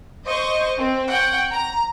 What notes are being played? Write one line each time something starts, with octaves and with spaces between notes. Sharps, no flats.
C5 D#5 C#6
C4
F#5 G5 C#6
A#5